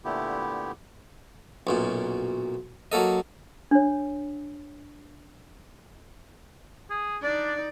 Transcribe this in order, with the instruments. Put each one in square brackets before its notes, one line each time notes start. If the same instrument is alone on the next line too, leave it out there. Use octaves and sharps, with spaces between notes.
[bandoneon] A#2 D3 A3 B3 E4 G4
[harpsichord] B1 F#2 A#2
F#3 A#3 A4 D#5
[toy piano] D4 C#5
[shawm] G#4
[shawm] D4 [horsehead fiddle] D#4 D5